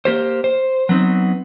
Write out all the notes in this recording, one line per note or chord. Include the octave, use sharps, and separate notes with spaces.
A#3 G4 C5
C5
F#3 B3 C4 D#4